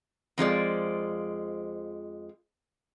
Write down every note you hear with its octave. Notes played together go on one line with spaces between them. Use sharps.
F2 F3 G#3 D5